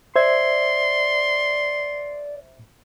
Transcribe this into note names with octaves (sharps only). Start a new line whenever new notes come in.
C5 D5 E5 C6 G#6